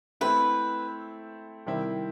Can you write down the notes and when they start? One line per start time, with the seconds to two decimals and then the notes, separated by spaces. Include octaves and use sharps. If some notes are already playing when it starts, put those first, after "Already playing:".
0.21 A3 C4 E4 B4
1.66 C3 D#3 G3 C4 E4